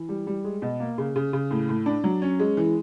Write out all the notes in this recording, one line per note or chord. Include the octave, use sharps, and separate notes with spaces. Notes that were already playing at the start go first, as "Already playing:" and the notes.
Already playing: E3
G3
G3
G#3
B2
A#3
C#3
C#3
C#3
A2
A2
D4
F#3
C#4
G#3
E3